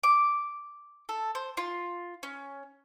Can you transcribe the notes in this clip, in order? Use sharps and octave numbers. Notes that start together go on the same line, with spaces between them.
D6
A4
C5
F4
C#4